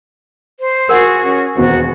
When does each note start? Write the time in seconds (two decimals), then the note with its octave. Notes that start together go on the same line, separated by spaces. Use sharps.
0.60 C5
0.89 F#4 G#4 A#4 F#5
1.23 C#4
1.56 E1 D#2 B3 F#4 C5